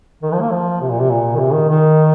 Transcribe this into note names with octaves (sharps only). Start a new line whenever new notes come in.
D#3
F3
A#3
F3
C3
A#2
C3
A#2
D#3
C3
D#3
D#3